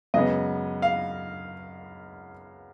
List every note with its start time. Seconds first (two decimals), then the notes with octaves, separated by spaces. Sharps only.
0.14 F#2 C#3 G#3 B3 D#5
0.82 F5